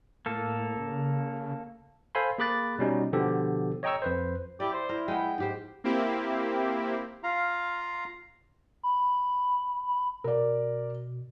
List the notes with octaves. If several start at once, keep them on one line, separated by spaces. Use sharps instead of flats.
A2 A#3 A4
C#3
A4 C5 F5 G#5 B5 C6
A#3 G#4 B5 D6 F#6 A6
B2 G3 C#4 D#4
B2 D3 F3 B3 G4 A4
C#5 D#5 G5 A#5 C#6 E6
F2 B4 C5
E4 G4 D5
C5
E4 A#4
G#3 B3 G5
G#2 G4 C5
A#3 C4 E4 G4
F4 F5 A#5
B5
B2 A#4 D5